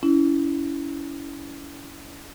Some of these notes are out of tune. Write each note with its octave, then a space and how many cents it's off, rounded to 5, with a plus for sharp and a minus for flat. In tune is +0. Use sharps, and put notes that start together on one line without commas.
C#4 +30 E4 +0